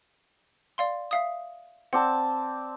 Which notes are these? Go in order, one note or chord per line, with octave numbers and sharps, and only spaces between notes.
D5 F5 C6
E5 F5 D#6
C4 D5 F#5 A5